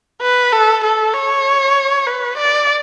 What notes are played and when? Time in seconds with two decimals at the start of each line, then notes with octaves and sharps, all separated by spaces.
0.22 B4
0.52 A4
0.84 A4
1.14 C#5
2.07 B4
2.38 D5